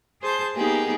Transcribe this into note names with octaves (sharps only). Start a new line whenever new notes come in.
G#4 C5 A5 G6
A#3 B3 D#4 G4 G#4